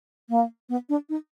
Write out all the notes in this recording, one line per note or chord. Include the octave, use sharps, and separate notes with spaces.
A#3
B3
D4
D#4